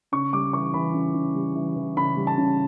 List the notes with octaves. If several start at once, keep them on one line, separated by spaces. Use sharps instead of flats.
C#3 C#6
G3 D6
E3 C#6
E3 B5
C#3
C#3
G3
E3
E3
C#3 B5
G3
A5
C#3